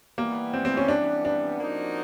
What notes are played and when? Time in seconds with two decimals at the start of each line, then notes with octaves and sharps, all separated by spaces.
0.18 E3 G3 A#3 B3
0.53 C4
0.65 C4
0.77 C#4
0.88 D4
1.25 D4
1.59 F3 A#3 D#4 F#4